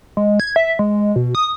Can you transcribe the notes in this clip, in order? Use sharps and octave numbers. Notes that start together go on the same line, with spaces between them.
G#3
G#6
E5
G#3
B2
D#6